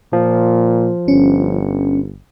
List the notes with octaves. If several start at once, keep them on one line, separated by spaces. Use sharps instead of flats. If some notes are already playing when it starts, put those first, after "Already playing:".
A#2 F3
G1 C#4